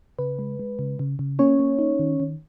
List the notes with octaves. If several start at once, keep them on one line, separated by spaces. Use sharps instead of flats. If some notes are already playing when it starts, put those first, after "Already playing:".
C#3 B4
G#3
G#3
C#3
C#3
C#3
A#3 C#4 C#5
A#3
D#4
D#3
D#3